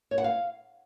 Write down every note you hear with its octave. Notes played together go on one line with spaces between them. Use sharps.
C#5
F#5
F5